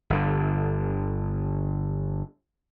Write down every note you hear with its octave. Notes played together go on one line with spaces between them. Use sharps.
G1 D3